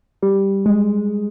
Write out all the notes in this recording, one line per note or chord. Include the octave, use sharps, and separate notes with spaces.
G3
G#3